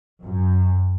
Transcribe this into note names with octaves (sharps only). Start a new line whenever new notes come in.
F#2